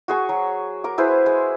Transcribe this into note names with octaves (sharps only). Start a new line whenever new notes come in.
F#4 G#4 C#6
F#3
A#4 D6
E4 G#4 B4 C5
G#3